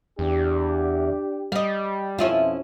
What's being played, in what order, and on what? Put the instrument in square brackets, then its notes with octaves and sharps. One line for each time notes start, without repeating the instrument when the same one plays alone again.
[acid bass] E2 [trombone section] D4 G4
[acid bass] G3 [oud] D#5 F5
[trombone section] F2 B2 F3 [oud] C#4 E4 F4